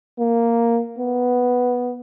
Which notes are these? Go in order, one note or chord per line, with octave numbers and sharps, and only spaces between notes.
A#3
B3